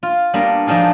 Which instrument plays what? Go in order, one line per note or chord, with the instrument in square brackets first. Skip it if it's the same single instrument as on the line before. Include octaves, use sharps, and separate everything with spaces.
[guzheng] F4
G3 A#3 B3 D4
F3 G#3 D4 D#4 F4 G#4